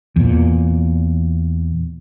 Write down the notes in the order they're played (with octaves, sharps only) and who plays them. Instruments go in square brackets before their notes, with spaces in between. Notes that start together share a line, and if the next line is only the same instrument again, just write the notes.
[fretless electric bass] E2 A#2